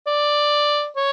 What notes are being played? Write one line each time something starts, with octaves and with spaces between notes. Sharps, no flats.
D5
C#5